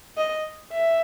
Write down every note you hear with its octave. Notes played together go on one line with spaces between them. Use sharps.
D#5
E5